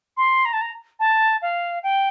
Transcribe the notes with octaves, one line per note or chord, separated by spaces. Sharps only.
C6
A#5
A5
A#5
A5
F5
G5